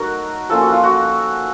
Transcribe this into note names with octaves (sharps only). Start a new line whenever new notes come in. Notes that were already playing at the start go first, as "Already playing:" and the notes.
Already playing: F#3 A3 D#4 F#4 A#4
F3 A#3 C#4 F4 A4
F#4
F4
F#4